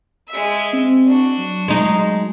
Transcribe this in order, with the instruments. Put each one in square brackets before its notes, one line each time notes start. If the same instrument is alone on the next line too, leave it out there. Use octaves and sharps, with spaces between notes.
[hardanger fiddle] G#3 E5
[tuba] C4
[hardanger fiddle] D4 F#4
[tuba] F#3
[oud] G#3 D#4